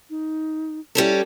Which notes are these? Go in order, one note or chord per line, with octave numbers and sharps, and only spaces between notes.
D#4
G3 C#4 E4 A4